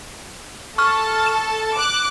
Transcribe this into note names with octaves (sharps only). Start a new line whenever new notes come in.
A4 A5 C#6 F6
E7
D6 F#6